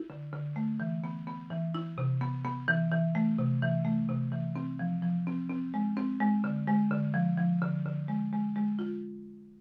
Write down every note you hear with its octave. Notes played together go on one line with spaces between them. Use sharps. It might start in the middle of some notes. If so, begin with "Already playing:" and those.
Already playing: E4
D3
D3
A3
E3
B3
B3
E3
E4
C3
B3
B3
E3
E3
A3
C3
E3
A3
C3
E3
C4
F3
F3
C4
C4
G#3
C4
G#3
D3
G#3
D3
F3
F3
D3
D3
G#3
G#3
G#3
F4